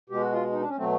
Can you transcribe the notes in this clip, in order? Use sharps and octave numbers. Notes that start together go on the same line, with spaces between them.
B2 G#3 G4
F#4
F4
D#4
D4
C#4
B2 F#3 A3 C4